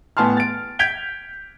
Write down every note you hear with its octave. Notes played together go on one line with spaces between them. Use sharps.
A2 B3 G#5 A5 C6 F6
A6 D7
G6 G#6 B6 D7 F7 G7